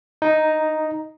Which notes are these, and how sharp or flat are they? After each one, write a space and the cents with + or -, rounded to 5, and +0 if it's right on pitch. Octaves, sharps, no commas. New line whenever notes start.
D#4 +0